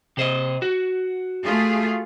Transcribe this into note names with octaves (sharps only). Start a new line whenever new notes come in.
C3 C5 D#5
F#4
A3 F4 G#4